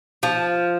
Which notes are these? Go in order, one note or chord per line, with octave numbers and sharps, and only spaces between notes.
F3